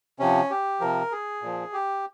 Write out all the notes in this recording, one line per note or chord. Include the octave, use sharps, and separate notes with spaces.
C3 F3 C#4
G4
C3 F3 A#4
G#4
A#2 F3
G4